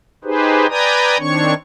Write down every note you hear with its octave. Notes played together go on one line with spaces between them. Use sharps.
D#4 G4 G#4 B4 C5
B4 D5 G5 G#5 A#5 D#6
D#3 C4 D4 C#5 C#6